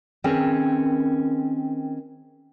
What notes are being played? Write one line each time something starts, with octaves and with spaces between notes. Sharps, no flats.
D#3 C4 C#4 G#4 A#4 B4